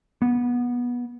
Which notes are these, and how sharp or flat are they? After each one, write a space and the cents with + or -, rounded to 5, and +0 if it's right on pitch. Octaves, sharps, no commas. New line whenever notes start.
B3 -20